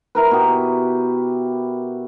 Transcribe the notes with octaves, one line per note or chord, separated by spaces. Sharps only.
E4 A#4 B4
B2 G4